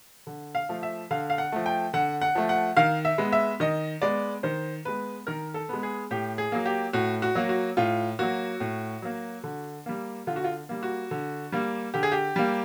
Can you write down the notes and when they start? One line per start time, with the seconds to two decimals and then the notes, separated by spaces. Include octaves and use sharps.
0.27 D3
0.55 F5
0.69 F3 A3
0.83 E5
1.11 D3 F5
1.30 F5
1.38 F#5
1.52 F3 A3
1.66 G5
1.94 D3 F#5
2.22 F#5
2.35 F3 A3
2.49 F#5
2.77 D#3 F5
3.05 E5
3.18 G#3 B3
3.32 E5
3.60 D#3 D#5
4.02 G#3 B3 D5
4.43 D#3 C5
4.85 G#3 B3 B4
5.27 D#3 A#4
5.54 A4
5.69 G#3 B3
5.83 G#4
6.11 A2 G4
6.38 G#4
6.52 F#3 A#3
6.66 G4
6.93 A2 F#4
7.22 F#4
7.35 F#3 A#3
7.49 F#4
7.77 A2 F4
8.19 F#3 A#3 F#4
8.60 A2
9.02 F#3 A#3
9.44 D3
9.86 G3 A#3
10.27 D3 F4
10.36 F#4
10.44 F4
10.69 G3 A#3
10.83 F#4
11.11 D3
11.52 G3 A#3
11.94 D3 G4
12.03 G#4
12.12 G4
12.36 G3 A#3